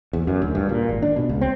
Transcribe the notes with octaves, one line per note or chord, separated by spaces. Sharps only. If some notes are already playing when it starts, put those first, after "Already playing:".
E2
F#2
D2
G2
A#2
G#1
D4
B2
C#2
C4